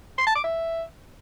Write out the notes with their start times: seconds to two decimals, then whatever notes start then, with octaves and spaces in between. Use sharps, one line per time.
0.18 C6
0.27 A5
0.35 D6
0.44 E5